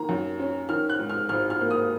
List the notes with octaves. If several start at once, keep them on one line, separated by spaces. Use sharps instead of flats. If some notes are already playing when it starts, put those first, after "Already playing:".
Already playing: D#3 A#3 A#5
F#2
C#4
D#3 F6
F#6
G#2
F6
G#1 F6
F6
A#3
D#6